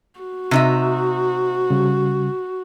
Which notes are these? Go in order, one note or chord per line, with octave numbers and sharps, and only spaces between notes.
F#4
C3 D#4 E5
C#3 G3